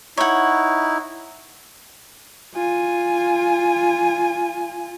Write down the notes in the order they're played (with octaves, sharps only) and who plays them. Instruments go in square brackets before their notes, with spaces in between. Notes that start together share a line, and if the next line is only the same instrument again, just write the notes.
[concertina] D#4 E4 [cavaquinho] C#5 F#5
[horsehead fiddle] F4 G#5